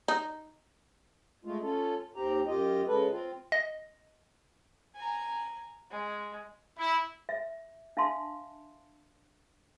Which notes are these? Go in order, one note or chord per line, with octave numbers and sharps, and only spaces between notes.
D#4
G#3 A3 F4
C#4 F4 A4
D#2 C4 G4 A#5
F#2 F4 G4 D#5
C#3 G#3 A4 B4
C4 F4
D#5
G#5 A#5
G#3
E4
E5
D4 E5 F5 A5 C6